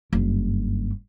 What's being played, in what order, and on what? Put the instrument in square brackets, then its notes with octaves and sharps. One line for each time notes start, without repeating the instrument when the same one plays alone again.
[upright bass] F#1 G2